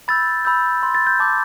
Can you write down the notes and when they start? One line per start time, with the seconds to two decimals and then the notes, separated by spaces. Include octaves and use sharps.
0.08 B5 E6 G6 A6
0.45 B5 E6 G6
0.83 C6 G6
0.95 A6
1.07 G6
1.20 A5 D6 G6